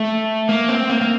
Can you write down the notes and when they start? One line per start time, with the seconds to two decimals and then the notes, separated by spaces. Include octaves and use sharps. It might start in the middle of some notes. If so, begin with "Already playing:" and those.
Already playing: A3
0.49 A#3
0.68 C4
0.90 A#3
1.01 A#3